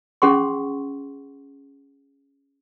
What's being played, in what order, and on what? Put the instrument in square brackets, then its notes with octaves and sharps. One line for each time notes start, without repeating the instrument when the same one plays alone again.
[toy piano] C#4 G#4 F#5 C6 C#6